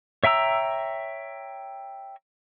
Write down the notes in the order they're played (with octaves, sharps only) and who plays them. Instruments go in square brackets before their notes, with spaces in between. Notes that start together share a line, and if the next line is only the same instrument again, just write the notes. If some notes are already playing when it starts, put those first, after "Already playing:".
[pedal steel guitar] C#5 E5 G5 A#5 E6